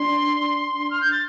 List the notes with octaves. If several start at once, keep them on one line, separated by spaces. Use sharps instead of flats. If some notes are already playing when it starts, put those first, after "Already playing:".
Already playing: D4 C6
F6
G6
A6